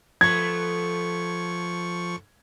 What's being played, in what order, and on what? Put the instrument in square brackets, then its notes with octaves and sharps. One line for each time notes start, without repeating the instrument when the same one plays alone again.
[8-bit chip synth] F3 C#6 [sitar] A3 B3 [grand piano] G#6